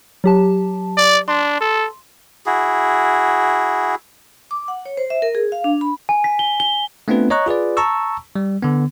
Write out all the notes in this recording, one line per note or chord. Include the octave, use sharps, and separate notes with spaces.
F#3 G4 A5
D5
D4 C6
A4
E4 F#4 G#4
D6
F#5
C#5
C5
E5
A#4
G#4
F5
D4
B5
G#5
B6
G7
G7
A3 B3 C4 D4 F4 B4
C#5 D#5 A#5 C#6 F#6
F4 G#4 B4 D5
A5 A#5 C#6 E6
G3
D3 B3